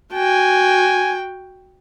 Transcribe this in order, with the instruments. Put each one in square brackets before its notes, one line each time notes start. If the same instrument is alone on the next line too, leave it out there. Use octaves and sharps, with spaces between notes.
[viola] F#4 G5 [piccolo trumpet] G#5